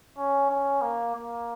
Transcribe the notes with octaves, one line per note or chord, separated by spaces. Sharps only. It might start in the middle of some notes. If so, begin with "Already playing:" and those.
C#4
C#4
A#3
A#3